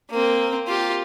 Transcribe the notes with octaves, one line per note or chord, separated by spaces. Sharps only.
A#3 C4
F4 G4